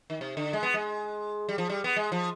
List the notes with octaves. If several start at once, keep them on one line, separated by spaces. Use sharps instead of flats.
D#3
C3
D3
G#3
B3
G#3
G3
F3
G3
B3
G#3
F3